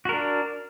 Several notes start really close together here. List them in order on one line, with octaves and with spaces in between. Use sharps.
F#4 A#4 D4